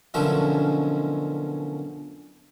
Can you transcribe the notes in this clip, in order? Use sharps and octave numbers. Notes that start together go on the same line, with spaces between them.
F#2 B2 D3 F3 C#4 E4